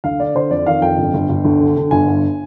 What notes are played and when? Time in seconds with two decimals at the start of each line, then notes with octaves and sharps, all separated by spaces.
0.04 D2 F5
0.20 D3 D5
0.35 D3 C5
0.50 F2 D5
0.66 D#3 F5
0.81 F2 G5
0.98 G1
1.14 G1
1.29 G1
1.45 D2
1.60 D3
1.77 D3
1.91 G1 G#5
2.08 G2